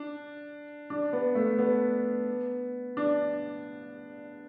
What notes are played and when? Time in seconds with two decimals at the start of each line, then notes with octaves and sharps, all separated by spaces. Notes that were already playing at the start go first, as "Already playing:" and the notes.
Already playing: D4
0.90 D4
1.13 B3
1.35 A3
1.59 B3
2.97 D4